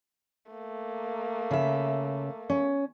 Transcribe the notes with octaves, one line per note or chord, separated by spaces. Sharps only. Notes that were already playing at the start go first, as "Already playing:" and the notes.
A3 A#3
C#3 E5
C#4